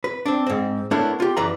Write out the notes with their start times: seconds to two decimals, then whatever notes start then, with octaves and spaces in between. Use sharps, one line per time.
0.04 B4
0.26 C4 D4
0.46 G#2 C4
0.91 A3 B3 D4 E4 A#4 C#5
1.20 F4 G4
1.37 F#2 E3 B4 D5 A#5